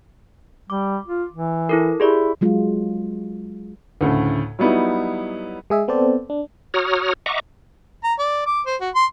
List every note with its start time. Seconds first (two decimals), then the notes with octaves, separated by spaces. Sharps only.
0.70 G3 D6
1.08 F4
1.33 E3
1.69 E4 A4 A#4
2.00 E4 G4 G#4 D5
2.41 F#3 G#3 F4
4.01 D2 A2 C#3
4.59 F#3 G3 B3 D#4 E4
5.70 G#3 G#4 E5
5.88 B3 C4 A4 C5 D5
6.30 D4
6.74 F#4 C#5 A#5 D#6 F6
7.26 D#5 E5 F#5 A#5 C#6 D6
8.04 A#5
8.19 D5
8.46 D6
8.66 C5
8.81 F#4
8.95 C6